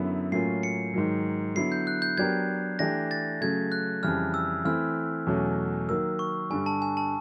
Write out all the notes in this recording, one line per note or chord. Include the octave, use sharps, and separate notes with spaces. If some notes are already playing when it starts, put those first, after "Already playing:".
Already playing: F#2 D3 F#3 B3 E4
A2 F#3 A#3 C#4 F4 C7
C#7
G#2 D#3 F#3
D3 F#3 B3 E4 C7
G6
F#6
G6
F#3 B3 D4 G4 A#4 G#6
E3 A3 D4 G4 A#6
A6
C#3 F#3 A3 G#6
F#6
F2 C#3 E3 G3 F6
E6
E3 A3 C4 E4 F6
E2 B2 F#3 A3 C#4
D#3 F#3 A#3 E6
C#6
G2 D3 G3 G#5
A5
G#5
A5